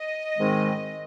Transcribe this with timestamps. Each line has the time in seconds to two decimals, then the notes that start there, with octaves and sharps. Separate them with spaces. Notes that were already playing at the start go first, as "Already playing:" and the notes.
Already playing: D#5
0.37 G#2 D#3 G#3 C4